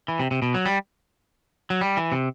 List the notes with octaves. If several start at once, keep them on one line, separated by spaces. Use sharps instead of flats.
E3
C3
C3
B2
F#3
G3
F#3
G3
E3
C3